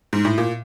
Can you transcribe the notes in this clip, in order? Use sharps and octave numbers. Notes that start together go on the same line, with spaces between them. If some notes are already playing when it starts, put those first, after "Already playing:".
G#2
A2
A#2